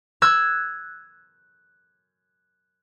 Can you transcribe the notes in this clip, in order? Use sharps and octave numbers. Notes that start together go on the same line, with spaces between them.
E6 F#6 G#6